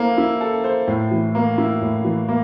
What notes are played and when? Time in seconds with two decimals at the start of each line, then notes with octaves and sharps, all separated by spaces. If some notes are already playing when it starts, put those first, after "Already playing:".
Already playing: A#3 E4 A4 C5
0.18 E4
0.41 A4
0.64 C5
0.88 A2
1.11 E3
1.35 A#3
1.58 E4
1.82 A2
2.04 E3
2.28 A#3